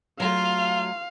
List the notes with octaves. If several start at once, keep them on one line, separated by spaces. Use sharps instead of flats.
F#3 A3 F4 F5